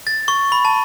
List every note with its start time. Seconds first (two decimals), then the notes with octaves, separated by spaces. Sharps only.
0.07 A6
0.28 C#6
0.52 B5
0.65 A5